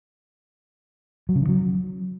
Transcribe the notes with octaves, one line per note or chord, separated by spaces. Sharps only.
F#3
C#3
D#3
F#3